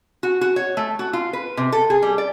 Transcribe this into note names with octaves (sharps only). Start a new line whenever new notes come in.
F#4
F#4
C#5
A3
F#4
F4
B4
C3
A4
G#4
G3
D5